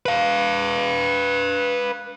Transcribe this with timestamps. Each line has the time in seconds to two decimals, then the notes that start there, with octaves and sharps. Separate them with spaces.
0.06 B4 F5